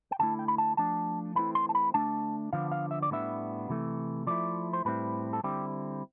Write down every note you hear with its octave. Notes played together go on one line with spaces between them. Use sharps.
G5
D3 F3 A3 E4 A5
G5
B5
A5
F3 A3 D4 A5
E3 A3 C4 E4 B5
C6
A5
B5
D3 A3 D4 A5
D3 F3 B3 D4 F5
F5
E5
D5
A2 G3 B3 D4 E5
C3 E3 A3
F3 A3 E4 D5
C5
A2 G3 C4 E4 B4
A4
D3 G3 C4 E4 G4